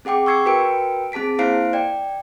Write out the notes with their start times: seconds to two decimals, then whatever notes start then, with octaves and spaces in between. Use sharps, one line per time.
0.05 C4 G#4 F#5 G5 D6
0.26 C#6 E6 G#6 C7 C#7
0.46 F#4 A#4 B4 G5 D7
1.12 C4 G#4 A5 B6 D7
1.38 A#3 E4 C5 F5 C7 D7
1.73 D5 G5